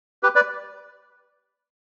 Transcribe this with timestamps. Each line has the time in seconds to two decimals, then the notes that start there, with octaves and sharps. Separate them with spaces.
0.23 G4 B4
0.35 B4 D5